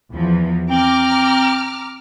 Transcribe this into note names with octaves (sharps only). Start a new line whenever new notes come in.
E2 E3 F3
C4 A#5 D6 F6